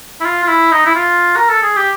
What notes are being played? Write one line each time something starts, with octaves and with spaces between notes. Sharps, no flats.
E4
F4
F4
E4
D#4
E4
F4
A#4
A4
G#4
G4